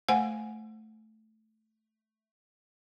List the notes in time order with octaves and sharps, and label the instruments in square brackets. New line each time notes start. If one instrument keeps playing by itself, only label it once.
[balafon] A3 C5 F#5 G#5